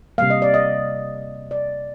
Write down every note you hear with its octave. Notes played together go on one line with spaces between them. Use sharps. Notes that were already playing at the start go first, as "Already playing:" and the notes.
C3 G3 A#3 F5
D#5
D5
D#5
D5